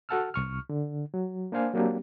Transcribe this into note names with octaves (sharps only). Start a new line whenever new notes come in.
F#4 A4 F#5 A5 E6 F6
C2 C#6 F6
D3
F#3
A#3 D4 C5 F5 G#5
F#3 A#3 C4 D4 G4